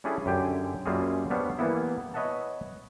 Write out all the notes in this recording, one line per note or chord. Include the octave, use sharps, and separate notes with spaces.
G3 C#4 D4 E4 G#4 A4
F#2 D3 G4 G5 G#5
F#2 G3 A#3 F4 F#4 G#4
G3 B3 D4 C5 C#5 F5
E3 G3 A#3 B3 E4
B4 C#5 D#5 E5 F#5 A5